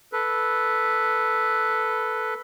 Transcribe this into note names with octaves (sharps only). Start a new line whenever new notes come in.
A4 B4